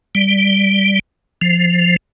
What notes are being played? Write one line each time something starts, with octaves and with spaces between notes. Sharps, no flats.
G3
F3